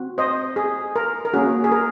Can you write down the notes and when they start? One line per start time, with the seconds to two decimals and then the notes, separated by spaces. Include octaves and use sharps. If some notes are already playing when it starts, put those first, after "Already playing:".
Already playing: C4 F#4
0.18 C5 D#5
0.56 G#4
0.96 A#4
1.25 A#4
1.34 A#3 C#4 F#4 G#4
1.64 G#4
1.72 A#4